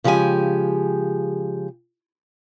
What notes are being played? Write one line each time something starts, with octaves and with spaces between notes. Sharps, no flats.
C#3 F3 G#3 G4 G#5